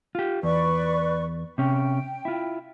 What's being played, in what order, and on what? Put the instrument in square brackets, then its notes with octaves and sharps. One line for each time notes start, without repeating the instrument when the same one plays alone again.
[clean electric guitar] F4 G4
[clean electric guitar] E2 [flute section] B4 D5 C#6
[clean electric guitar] C3 C#4 [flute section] G5
[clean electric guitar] E4 F4